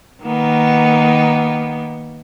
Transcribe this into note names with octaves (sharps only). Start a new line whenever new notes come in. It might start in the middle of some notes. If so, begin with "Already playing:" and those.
D#3 A#3 B3